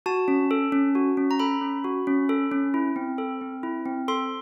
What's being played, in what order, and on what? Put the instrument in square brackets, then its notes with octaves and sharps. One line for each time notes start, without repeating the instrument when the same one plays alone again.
[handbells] F#4 A5
C#4
A4
C#4
F#4
C#4
A#5
A4 B5
C#4
F#4
C#4
A4
C#4
E4
C4
A4
C4
E4
C4
A4 C6